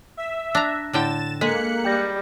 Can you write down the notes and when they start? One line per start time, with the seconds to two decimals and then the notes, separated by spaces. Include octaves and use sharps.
0.17 E5
0.55 D4 A#5 E6 F#6 A#6
0.93 A2 D3 G5 A6 E7
1.41 G#3 A#3 G#4 A4 D#5 F#6 B6 C#7
1.85 G3 G5 G6 A#6